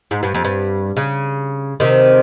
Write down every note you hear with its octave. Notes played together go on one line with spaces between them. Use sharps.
G#2
G2
F2
G2
C#3
C3 D#3